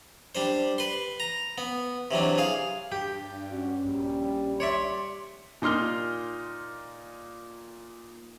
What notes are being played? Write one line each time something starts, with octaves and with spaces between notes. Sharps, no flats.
G3 D4 C5
B4 C6
A#5
B3
C3 E3 F#3 D4
G#4 F5
G2 G4
C#4 F#4
A#1 G3
C#5 D5 E5 C6
A#2 D#4 C6 F6 G7